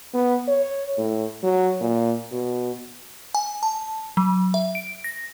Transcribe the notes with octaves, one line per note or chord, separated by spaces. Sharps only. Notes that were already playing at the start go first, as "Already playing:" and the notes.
B3
C#5
A2
F#3
A#2
B2
G#5
A5
F#3
E5
D7
A#6